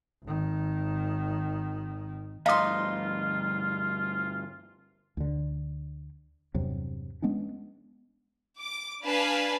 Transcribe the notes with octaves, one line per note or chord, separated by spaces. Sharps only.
G#1 D#3
D2 G2 D#4 F4 F5 C6 D#6
D2 D3
E2 G2 C3 F#3
G#3 B3 C#4 D4
D6
D4 B4 F5 G#5 A5